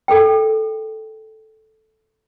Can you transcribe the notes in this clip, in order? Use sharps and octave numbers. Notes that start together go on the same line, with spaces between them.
A4 A#4 G5